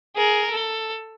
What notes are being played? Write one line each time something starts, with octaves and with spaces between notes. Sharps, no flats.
G#4 A#4
A4